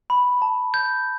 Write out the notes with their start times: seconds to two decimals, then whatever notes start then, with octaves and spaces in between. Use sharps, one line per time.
0.10 B5
0.42 A5
0.74 G6